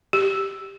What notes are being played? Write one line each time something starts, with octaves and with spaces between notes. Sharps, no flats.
G4